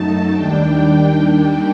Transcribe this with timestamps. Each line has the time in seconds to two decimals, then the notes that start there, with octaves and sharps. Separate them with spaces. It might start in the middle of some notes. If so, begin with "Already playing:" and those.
Already playing: F#2 F#3 A3 D#4 A5
0.32 D#2 D#3 G3 D4 G5